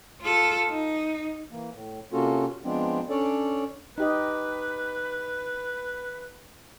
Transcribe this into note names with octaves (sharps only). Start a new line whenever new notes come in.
F4 A4
D#4
E3 A#3
A2
C3 A#3 C#4 F4 F#4 A4
F3 G#3 B3 C4 D4
C#4 D4 A4 C#5 D5
D#4 G4 B4 D#5